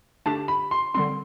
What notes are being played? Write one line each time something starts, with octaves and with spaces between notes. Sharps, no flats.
D3 A3 D4 G4 A5
B5
C6
D3 G3 C4 C6